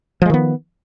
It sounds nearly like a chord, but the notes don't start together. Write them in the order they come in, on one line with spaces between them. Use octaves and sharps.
F3 G#3 D#3 B3